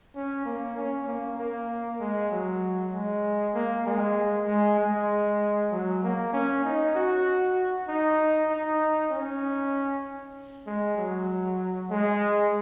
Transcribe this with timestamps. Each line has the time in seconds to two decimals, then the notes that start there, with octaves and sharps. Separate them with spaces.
0.15 C#4
0.46 A#3
0.77 C#4
1.08 A#3
1.39 A#3
2.00 G#3
2.32 F#3
2.94 G#3
3.55 A#3
3.86 G#3
4.48 G#3
4.79 G#3
5.71 F#3
6.03 A#3
6.33 C#4
6.65 D#4
6.95 F#4
7.88 D#4
8.50 D#4
9.12 C#4
10.67 G#3
10.98 F#3
11.91 G#3